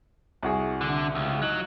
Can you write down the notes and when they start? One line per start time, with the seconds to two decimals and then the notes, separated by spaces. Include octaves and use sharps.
0.43 C2 F#4 G#4
0.81 D3
1.15 C#2
1.42 F#3 D#4 F#7